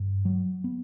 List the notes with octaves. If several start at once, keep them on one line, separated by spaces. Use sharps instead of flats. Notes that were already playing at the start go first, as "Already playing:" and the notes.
Already playing: G2
F#3
B3